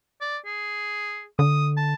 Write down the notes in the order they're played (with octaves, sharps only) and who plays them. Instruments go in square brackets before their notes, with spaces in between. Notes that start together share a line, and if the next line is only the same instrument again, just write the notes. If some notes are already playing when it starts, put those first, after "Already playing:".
[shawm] D5
G#4
[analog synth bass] D3 [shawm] D#6
[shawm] A5